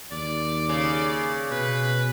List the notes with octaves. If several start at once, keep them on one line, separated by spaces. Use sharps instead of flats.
D#2 D5
C#3
B2 B4